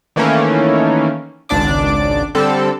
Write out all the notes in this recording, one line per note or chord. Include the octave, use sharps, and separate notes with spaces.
D#3 E3 A3 A#3 C#4
G#1 C#2 D4 D5 D6
D3 G3 C4 A4